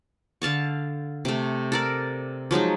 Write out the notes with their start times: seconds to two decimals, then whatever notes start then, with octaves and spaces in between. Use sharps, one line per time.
0.42 D3 F5 A5 C#6
1.25 C3 A3
1.72 A4 A#4 D5
2.51 F3 F#3 G#3 D#4